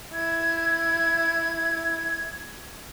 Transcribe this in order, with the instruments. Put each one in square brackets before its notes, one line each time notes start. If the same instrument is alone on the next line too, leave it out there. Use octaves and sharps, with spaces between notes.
[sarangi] E4 [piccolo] G#6